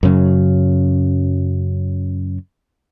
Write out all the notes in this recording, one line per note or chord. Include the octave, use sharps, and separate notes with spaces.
F#2 C#3 F#3